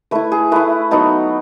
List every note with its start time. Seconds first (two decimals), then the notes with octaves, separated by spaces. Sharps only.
0.11 A3 E4 B4
0.32 G#4
0.52 A3 E4 B4
0.91 F#3 B3 D#4 A4